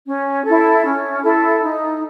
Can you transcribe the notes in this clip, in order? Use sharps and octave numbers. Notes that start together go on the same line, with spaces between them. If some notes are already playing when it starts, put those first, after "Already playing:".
C#4
E4 A4
C#4
E4 A4
D#4